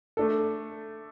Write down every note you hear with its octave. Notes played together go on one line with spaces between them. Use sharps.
A3 D4 A4